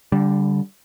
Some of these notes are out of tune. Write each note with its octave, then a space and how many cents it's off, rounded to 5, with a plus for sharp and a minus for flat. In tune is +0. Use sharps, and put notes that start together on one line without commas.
D3 -20 G3 +0